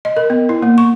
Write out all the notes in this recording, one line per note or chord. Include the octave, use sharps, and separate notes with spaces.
D#5
A#4
B3
E4
A#3
C#6